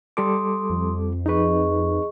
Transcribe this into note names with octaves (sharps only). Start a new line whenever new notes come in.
G3 A4 C6 D6 D#6
F2
D#4 G#4 B4 D#5 C#6